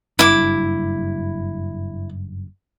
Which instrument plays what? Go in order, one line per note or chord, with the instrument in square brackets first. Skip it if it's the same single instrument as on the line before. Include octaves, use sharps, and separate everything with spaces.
[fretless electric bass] F#1 G2 [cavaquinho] E4 D6